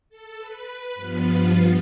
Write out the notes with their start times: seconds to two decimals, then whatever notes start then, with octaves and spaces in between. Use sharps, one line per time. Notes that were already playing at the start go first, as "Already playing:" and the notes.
0.09 A4
0.38 B4
0.95 G2 F3 B3 F4 B4